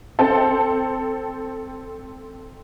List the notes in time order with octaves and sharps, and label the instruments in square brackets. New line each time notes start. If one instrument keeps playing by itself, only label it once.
[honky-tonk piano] C4 A4 C5 G5 A5